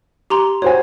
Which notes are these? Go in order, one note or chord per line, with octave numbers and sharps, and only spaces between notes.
G4 A#5 C6
F#4 C5 C#5 G#5